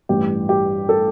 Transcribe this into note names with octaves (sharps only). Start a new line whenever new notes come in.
A1 G2 E3 G4
G4
A4